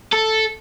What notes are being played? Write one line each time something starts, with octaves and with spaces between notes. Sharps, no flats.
A4